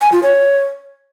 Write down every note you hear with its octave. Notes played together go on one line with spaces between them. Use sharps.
G#5
F4
C#5